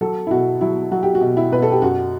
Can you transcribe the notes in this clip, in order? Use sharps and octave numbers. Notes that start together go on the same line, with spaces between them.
F#3 A4
E4
B2 F#4
F#3 E4
F#3 F#4
G4
F#4
B2
E4
B2 B4
A4
G4
F#2 F#4